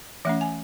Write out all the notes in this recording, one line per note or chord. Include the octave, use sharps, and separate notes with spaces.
E3 A3 C#4 E5
G#5